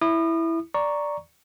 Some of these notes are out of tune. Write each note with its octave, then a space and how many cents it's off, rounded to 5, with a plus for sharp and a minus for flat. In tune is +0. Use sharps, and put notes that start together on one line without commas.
E4 +0 D#6 -40
D5 +0 A#5 +0 C#6 +0